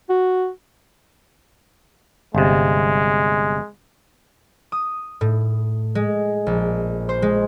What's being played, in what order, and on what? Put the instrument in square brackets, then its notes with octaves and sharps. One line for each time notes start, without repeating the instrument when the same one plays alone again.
[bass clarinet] F#4
[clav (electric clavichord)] G1 C3 [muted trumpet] G#3
[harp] D#6
A2
G#3
A#1
C5
G#3